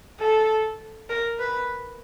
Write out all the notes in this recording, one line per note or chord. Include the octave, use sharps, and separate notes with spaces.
A4
A#4
B4